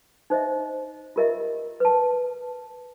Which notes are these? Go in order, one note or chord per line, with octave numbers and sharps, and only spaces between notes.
D#4 C5 D#5 E5
F4 G4 A#4 D#5 E5 A#5
B4 A5